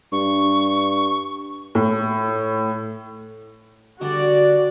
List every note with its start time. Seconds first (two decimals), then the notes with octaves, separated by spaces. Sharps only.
0.12 G2 C#6
1.75 A2
4.01 D3 G3 F#4 D5